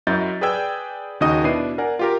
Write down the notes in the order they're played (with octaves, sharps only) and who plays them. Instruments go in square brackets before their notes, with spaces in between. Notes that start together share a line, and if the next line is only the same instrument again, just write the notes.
[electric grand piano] F#2 E4 F#4 D#5 G6 A6
G#4 B4 D5 G5 E6 G#6
D#2 C#3 D#4 F#4 D#5 D#6
B2 B3 D4 E4 C7 D#7
A#4 D5 F#5 G#5
F4 G4 A#4